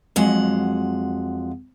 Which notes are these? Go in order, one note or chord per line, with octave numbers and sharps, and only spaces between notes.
F2 F#3 G#3 F#5